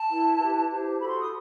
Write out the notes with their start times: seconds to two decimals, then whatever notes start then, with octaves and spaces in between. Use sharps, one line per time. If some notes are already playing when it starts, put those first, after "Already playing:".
Already playing: A5
0.09 E4 B4
0.39 E4 G4 B4
0.68 E4 G4 C5
0.99 F#4 A4 C5 B5
1.09 C6
1.20 D#6